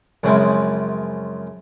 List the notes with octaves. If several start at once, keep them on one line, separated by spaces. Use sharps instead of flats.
F#2 C#3 F3 G#3 C4 E4